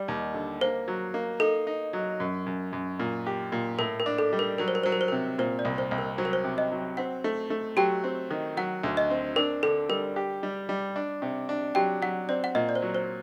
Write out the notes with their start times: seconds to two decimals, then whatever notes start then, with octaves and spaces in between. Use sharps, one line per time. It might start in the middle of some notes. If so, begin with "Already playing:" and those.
Already playing: G3 D5
0.08 D#2
0.34 D3
0.61 A#3 C5
0.88 F#3
1.14 A#3
1.40 D#4 A4
1.67 D#4
1.93 F#3
2.20 F#2
2.46 F#2
2.73 F#2
3.00 A#2
3.27 G4
3.52 A#2
3.79 A2 A#4
4.00 A#4
4.06 D4
4.18 A4
4.33 G3
4.39 A#4
4.58 F#3 A#4
4.68 C5
4.75 A#4
4.83 F#3 C5
4.92 A#4
5.01 C5
5.08 C3 A#4
5.39 A#2 C5
5.59 D5
5.65 C2
5.78 C5
5.91 C2
5.98 A#4
6.18 F#3 C5
6.25 A#4
6.33 C5
6.44 C3
6.58 D#5
6.72 F#3
6.97 C4 F#5
7.24 A3
7.50 A3
7.77 F#3 G4 G5
8.04 C4
8.31 D#3
8.57 F#3 F#5
8.84 D2
8.97 D#5
9.10 C4
9.36 D4 A#4
9.63 D3 A4
9.89 G3 A#4
10.16 G4
10.43 G3
10.69 G3
10.96 D4
11.22 C3
11.49 D4
11.75 F#3 G4 G5
12.02 F#3 F#5
12.29 C4 D5
12.44 F#5
12.55 A#2 D#5
12.69 D5
12.75 C5
12.82 F#3
12.95 C5